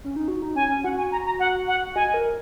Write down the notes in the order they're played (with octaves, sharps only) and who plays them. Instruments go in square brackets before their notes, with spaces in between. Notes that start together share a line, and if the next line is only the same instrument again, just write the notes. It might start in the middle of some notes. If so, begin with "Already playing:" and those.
[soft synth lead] C#4
D#4
F#4
D#4
[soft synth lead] C#4 [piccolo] G#5
[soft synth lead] C#4
[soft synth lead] F#4 [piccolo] F#5
[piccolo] G#5
A#5
A#5
F#5
F#5
[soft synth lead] D#5 [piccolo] G#5
[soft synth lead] A#4